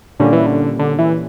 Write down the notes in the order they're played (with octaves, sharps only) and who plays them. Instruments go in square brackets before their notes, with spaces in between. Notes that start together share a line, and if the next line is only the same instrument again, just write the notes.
[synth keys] A#2 G3 A#3 C#4 [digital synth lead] D3
[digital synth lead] E3
D3
D3
E3